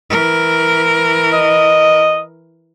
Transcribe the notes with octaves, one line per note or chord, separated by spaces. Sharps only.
E3 A#4
D#5